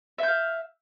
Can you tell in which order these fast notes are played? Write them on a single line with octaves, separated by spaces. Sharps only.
E5 G6 F5